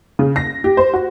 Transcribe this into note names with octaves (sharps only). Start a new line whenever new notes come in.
C#3
A#6
G4
C5
F#4